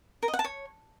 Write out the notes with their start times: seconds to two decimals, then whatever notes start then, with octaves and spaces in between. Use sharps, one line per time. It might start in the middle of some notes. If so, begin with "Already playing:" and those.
0.23 A#4
0.28 D#5
0.34 F#5
0.39 A5
0.44 C#5